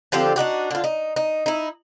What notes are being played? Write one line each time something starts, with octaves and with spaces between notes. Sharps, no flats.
D3 F3 C4 G4
D4 D#4 F#4 G4
D3 F4
D#4
D#4
D#4 E4